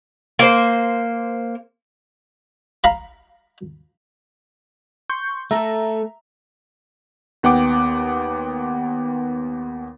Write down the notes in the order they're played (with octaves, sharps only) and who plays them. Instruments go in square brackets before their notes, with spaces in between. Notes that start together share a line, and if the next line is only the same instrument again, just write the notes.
[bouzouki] A#3 C5
[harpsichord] F5 A#5 B5
[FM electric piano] C6 C#6 G6
[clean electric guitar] A3 A4 [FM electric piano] E5 A#5
[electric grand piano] D#2 B3 F#5 G5 D6